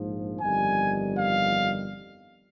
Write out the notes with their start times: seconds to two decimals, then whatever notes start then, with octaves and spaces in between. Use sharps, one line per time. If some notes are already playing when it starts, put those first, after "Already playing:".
Already playing: A#1 G#2 F3
0.41 G1 F2 D#3 G3 G#5
1.18 F5